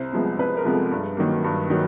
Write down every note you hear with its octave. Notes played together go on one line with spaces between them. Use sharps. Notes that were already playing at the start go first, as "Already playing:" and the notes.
Already playing: C2 C5
C3 F3 G#3 B3
C2 B4
A#4
C3 F3 G#3 B3
A4
G2
D#3 F#3 A#3
G2
D#3 F#3